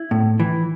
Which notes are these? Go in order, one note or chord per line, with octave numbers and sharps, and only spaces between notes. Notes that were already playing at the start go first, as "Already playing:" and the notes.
Already playing: E4
A2
E3